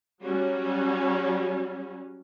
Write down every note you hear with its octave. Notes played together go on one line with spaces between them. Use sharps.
F#3 G3 C#4 F#4